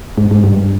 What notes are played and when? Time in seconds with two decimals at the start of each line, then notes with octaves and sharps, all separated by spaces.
0.18 G#2
0.31 G#2
0.44 G2